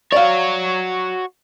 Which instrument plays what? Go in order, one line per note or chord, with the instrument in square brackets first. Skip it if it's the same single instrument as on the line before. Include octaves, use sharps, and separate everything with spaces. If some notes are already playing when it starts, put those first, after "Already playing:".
[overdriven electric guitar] F#4 C#5 [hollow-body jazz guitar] D5 F5